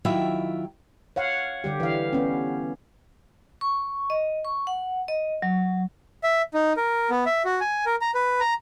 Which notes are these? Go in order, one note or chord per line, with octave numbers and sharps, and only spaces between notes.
D#3 F#3 E4 F4 E5 G5
C#5 F5 F#5
D3 G3 G4
E3 F5
B3 C#4
C#6
D#5
C#6
F#5
D#5
F#3
E5
D#4
A#4
B3
E5
F#4
G#5
A#4
A#5
B4
A#5